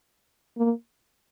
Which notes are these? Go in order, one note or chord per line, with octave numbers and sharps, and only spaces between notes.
A#3